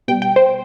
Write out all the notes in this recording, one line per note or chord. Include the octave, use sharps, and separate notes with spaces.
B2 G3 G5
G5
C5